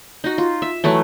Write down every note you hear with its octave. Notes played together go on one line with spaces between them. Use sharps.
D#4 F#4
F4
E5
E3 F#3 A3 E4